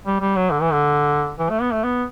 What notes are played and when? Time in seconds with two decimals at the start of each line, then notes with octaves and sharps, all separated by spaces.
0.07 G3
0.21 G3
0.36 F#3
0.51 D3
0.61 E3
0.72 D3
1.39 E3
1.50 A3
1.62 B3
1.73 A3
1.84 B3